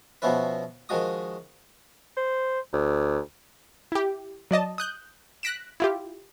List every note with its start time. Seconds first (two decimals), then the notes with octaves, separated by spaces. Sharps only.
0.22 B2 F3 B3 C#4 E4 B4
0.89 D#3 F3 G#3 F#4 D#6
2.17 C5
2.73 D2
3.92 E4 G4
4.51 F#3 D5 D#5 A5
4.78 D#6 F#6 G6
5.43 F#6 A#6 B6 D7 E7
5.80 E4 F4 G4